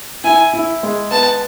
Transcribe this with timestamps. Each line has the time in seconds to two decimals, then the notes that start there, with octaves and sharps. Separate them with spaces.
0.24 E4 G#5
0.54 E4
0.83 G#3
1.11 B3 A5